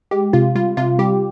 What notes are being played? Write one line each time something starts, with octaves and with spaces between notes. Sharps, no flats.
G#3 G4
C3 F4
G3 F4
C3 F4
G3 G4